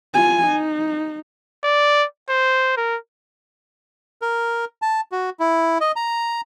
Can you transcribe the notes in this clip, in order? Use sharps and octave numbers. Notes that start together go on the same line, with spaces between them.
F4 G#5
D#4
D5
C5
A#4
A#4
A5
F#4
E4
D#5
A#5